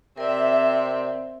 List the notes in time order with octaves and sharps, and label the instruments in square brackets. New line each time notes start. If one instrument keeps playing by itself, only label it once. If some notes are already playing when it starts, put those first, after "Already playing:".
[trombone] C3 [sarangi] C4 [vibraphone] A#4 D5 [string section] E5